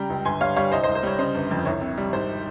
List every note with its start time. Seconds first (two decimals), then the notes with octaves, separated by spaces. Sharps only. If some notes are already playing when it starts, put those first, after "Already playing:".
Already playing: C#3 G3 G5 A#5
0.10 C#2
0.25 G1 G#5 C6
0.41 G3 C#5 F5
0.56 G3 C#5 F5
0.72 C2 C5 D#5
0.83 C5 D#5
0.88 C2
0.95 C5
1.03 G3 C#5
1.18 C#3 C5 D#5
1.35 G1
1.51 F2
1.65 C2 C#5
1.81 C3
1.97 G3
2.13 G#1 C5